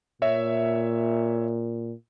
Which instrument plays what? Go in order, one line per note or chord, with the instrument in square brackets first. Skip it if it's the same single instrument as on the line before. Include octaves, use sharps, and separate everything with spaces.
[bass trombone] A#2 [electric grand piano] C#5 E5